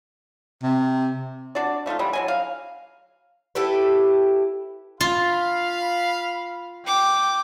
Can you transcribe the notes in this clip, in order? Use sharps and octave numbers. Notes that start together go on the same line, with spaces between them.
C3
D4 F#4 D5
F3 A3 D#4 F4
E3 G3 G#3 B3
D3 F#3 G#5
F5
E4 G4 A4 B4
F4 F5 B5
G5 D6